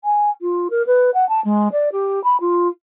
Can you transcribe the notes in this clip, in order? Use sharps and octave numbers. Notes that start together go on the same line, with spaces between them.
G#5
F4
A#4
B4
F#5
A5
G#3
D5
G4
B5
F4